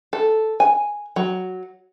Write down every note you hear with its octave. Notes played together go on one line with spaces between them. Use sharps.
A4
G#5
F#3